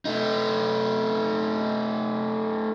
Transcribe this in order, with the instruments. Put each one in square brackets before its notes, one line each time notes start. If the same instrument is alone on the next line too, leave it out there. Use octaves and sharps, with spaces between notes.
[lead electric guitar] A3 D#4